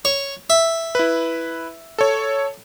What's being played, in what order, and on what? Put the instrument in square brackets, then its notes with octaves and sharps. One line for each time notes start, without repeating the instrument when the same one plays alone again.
[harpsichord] C#5
E5
[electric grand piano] E4 B4
A4 C#5